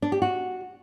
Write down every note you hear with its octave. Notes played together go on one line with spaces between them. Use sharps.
D4
G4
F#4